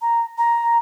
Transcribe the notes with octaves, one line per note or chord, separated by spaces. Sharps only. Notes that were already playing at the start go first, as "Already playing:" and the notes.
A#5
A#5